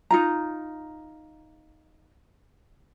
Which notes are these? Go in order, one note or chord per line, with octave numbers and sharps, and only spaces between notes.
D#4 F4 A#5